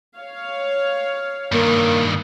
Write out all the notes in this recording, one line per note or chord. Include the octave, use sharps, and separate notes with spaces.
C#5 F5
G2 D#3 A#3